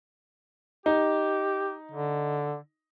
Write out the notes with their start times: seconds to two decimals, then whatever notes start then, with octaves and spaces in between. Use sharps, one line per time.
0.86 D#4 G4
1.92 D3